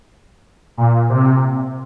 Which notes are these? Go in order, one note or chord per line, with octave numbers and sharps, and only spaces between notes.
A#2
C3